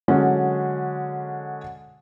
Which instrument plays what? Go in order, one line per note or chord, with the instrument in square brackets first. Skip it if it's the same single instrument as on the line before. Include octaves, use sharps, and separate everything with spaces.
[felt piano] D3 F#3 G#3 C#4